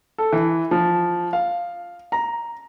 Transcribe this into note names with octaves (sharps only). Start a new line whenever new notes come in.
A4
E3
F3
F5
A#5